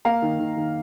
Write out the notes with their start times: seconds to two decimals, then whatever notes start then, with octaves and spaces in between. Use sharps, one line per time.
0.05 A#3 F5 A#5
0.22 D#3
0.39 D#3
0.57 D#3